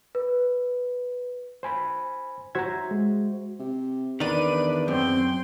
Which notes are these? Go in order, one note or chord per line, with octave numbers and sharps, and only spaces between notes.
B4
C5 G#5 B5
F#4 C5 E5 A#5 G#6
G#3
C3
E2 D#3 D4 B4 D5 D#7
F#2 C4 G5 C6